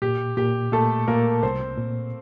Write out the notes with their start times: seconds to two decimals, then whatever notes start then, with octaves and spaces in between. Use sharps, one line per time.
0.02 A#2 G4
0.37 A#2 G4
0.72 A#2 A3 A4
1.08 A#2 A#3 A#4
1.43 C2 C4 C5
1.78 A#2